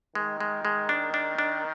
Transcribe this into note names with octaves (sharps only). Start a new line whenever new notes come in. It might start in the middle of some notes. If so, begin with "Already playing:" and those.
D#3 G#3
G#3
G#3
D4
D4
D4